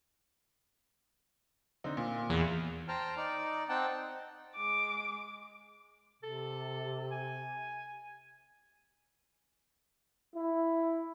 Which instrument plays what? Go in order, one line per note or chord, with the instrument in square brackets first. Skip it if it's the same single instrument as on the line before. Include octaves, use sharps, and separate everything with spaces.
[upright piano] D3 C4 D#4
A#2
[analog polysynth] E2
[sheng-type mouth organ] C5 G5 A5 A#5 F6
D#4 D5
C4 D#4 F#5 G5 A5
[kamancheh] G#3 D6
[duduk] C3 [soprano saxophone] A4
[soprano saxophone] G#5
[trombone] E4